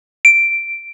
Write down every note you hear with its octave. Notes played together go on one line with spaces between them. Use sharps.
D7